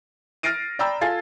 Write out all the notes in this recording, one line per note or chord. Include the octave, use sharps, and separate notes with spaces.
F6 A6 A#6 C7 D7 D#7
D5 G5 A#5 B5 E6
F4 A4 G#5 A6 C7